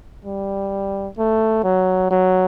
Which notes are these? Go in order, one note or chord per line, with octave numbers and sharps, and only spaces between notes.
G3
A3
F#3
F#3